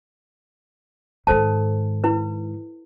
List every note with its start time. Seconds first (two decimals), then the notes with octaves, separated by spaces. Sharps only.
1.27 G#2 D#3 A4 C5 A5
2.04 E4 B4